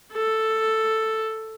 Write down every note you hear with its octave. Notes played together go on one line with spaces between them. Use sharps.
A4